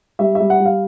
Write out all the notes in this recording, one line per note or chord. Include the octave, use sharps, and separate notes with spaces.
G3 E5
E5
G3
F#5
G3
F5